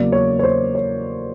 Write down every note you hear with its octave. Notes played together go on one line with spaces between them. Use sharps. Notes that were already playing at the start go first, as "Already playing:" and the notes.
Already playing: E2 C#3 F#3 A#3 D5
C#5
C#5
C5
C#5